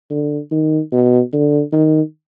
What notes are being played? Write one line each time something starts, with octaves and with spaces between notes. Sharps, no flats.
D3
D#3
B2
D3
D#3